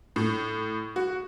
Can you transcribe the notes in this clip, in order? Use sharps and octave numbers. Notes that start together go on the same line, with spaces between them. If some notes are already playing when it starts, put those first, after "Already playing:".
A2
F#4